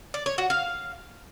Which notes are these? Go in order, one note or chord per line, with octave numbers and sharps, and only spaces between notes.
D5
C#5
F#4
F5